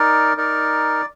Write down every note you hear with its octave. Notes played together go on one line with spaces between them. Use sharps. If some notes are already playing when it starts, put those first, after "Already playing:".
Already playing: D#4 A#4 D5
D#4 A#4 D5